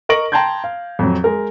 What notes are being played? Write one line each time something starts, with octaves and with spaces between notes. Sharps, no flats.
A#4 D#5 C#6 A#6 D7 F#7
G5 A5 A#5 C6 G6 G#6
F5
F2 F#3
G#3 A#4